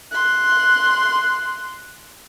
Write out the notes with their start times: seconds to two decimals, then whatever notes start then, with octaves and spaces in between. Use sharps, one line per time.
0.11 C6 F#6